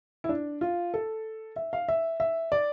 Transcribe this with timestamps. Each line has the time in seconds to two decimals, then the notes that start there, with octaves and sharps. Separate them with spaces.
0.24 E4
0.29 D4
0.61 F4
0.94 A4
1.56 E5
1.73 F5
1.88 E5
2.20 E5
2.52 D5